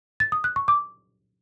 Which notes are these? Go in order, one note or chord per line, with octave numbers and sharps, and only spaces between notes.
A6
D#6
F#6
C#6
D6